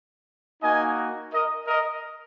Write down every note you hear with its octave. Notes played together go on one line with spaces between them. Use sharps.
A#3 D#4 F#4 D#5 G#5
A#4 D#5
A#4 D#5